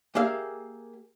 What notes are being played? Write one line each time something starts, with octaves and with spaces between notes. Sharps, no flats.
A#3 G4 G#4 E5 F5